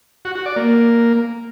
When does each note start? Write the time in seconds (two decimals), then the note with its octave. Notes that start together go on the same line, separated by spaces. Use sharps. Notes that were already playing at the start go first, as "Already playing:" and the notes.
0.25 F#4
0.35 F#4
0.46 D5
0.56 A#3